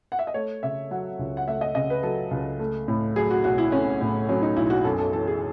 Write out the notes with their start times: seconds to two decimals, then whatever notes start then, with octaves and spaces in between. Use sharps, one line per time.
0.12 F#5
0.19 E5
0.27 D#5
0.34 A3 C#5
0.63 C#3 E5
0.91 F#3 F#5
1.19 C#2
1.37 F#5
1.47 A3 E5
1.61 D#5
1.75 C#3 D#5
1.90 B4
2.03 F#3 A4
2.31 C#2
2.60 A3
2.88 A2
3.16 F#3 G#4
3.31 F#4
3.44 B1 F#4
3.58 E4
3.72 A3 C#4
4.01 A2
4.29 F#3 C#4
4.42 D#4
4.57 B1 E4
4.67 E4
4.70 F#4
4.84 F#2 A4
4.98 A4
5.13 E3 A4
5.27 G#4